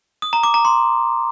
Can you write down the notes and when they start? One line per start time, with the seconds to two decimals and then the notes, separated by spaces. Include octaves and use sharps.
0.22 D#6
0.33 A#5
0.43 D6
0.54 A#5
0.65 C6